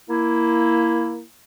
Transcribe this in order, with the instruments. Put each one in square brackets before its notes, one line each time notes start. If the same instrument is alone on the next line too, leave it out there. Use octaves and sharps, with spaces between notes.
[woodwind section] A#3 E4